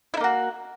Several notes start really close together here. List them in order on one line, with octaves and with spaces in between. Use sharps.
E4 D#4 A#3 F#4